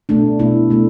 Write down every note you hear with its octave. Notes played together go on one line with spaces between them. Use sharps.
B2 A3 D4
B2 A3 E4
B2 A3